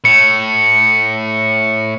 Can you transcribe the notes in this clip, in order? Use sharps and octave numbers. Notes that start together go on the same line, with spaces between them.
A2 C#7